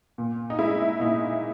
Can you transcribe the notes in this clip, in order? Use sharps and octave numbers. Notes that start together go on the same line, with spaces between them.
A#2
D#4
G#3 E4
A#2 D#4